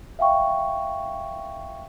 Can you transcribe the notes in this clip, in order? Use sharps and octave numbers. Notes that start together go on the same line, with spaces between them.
E5 F5 G5 C#6